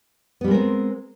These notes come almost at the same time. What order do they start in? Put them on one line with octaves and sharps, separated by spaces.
B3 G3 G#3 A#4 C4